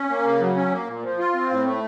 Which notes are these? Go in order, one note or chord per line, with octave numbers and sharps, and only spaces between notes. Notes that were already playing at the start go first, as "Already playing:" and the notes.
Already playing: C#4
A#3
C#3
F#3
C#4
A#3
A#2
F3
F4
C4
A2
A3